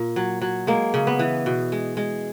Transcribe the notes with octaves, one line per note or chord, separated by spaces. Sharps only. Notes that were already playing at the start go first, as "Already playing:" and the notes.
Already playing: A#2
F#3
F#3
G#3 A#3
C#3
B3
E3
B2
G#3
G#3